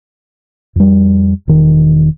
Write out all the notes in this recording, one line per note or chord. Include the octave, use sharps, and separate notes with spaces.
F2 G3
E1 D#3